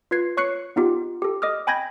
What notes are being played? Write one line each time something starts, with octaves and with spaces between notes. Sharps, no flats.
F4 B4 G#6 C7
C#5 C#6 F#6 C7 C#7
B3 D#4 F4 G4
G4 A4
D#5 D6 D#6 F6
G5 G#5 B5 G6 G#6 A#6